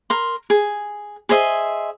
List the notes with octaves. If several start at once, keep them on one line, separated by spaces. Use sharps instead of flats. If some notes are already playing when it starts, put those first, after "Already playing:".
A#4 C6
G#4
G#4 C5 D#5 E5